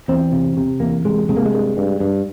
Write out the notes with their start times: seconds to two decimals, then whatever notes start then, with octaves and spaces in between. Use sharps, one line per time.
0.08 E2 C4
0.32 C3
0.57 C3
0.80 E2 A#3
1.05 C3 G#3
1.29 C3 G#3
1.37 A#3
1.45 G#3
1.52 G2
1.77 G2
2.00 G2